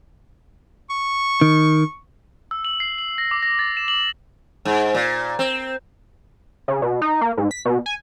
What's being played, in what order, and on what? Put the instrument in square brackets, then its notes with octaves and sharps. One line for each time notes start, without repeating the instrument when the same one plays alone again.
[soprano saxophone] C#6
[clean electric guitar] D#3
[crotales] E6
F#7
C7
F#7
A#6
D6
A#6
A6
E7
F#7
[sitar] G#2
A#2
C4
[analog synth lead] C#3
B2
D#4
A#3
G#2
B6
B2
G#5